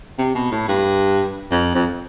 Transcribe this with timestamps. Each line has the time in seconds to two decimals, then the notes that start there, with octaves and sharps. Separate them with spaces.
0.18 C3
0.35 B2
0.52 A2
0.68 G2
1.51 F2
1.75 F2